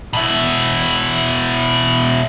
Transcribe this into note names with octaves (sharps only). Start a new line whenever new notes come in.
B2 E4